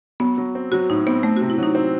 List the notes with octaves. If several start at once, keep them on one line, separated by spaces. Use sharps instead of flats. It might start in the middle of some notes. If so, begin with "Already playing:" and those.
F#3 B3
F#3
C4
F#3 F#4
A2 D#4
B3 C4
A3 C4
C3 F#4
E4
F#3 D#4
C4